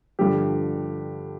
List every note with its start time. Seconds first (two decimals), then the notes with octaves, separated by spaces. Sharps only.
0.19 G2 D3 F3 G4